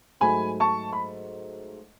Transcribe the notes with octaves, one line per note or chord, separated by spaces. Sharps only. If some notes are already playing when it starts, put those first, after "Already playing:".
G#2 F#3 A3 G#5 B5
A5 C#6
B5